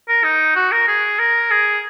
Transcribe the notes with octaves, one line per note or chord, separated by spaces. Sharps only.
A#4
D#4
F#4
A#4
G#4
A#4
G#4